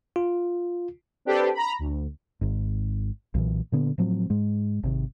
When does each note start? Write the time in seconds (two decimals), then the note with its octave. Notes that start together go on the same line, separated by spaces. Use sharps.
0.16 F4
1.25 C4 D4 G4 A4 B4
1.53 A#5 B5
1.79 D2
2.41 G#1 G#2
3.34 B1 A#2 E3
3.72 A#2 D3 B3
3.98 A2 F3 F#3 C4
4.30 G#2 G#3
4.83 G#1 C3